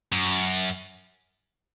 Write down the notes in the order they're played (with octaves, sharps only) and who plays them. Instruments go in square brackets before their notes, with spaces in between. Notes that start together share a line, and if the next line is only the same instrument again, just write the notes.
[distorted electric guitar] F#2